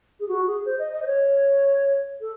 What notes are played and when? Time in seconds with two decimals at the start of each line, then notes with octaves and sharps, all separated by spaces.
0.19 G#4
0.28 F#4
0.46 G#4
0.65 C5
0.78 D#5
0.92 D#5
1.02 C5
1.06 C#5
2.20 A4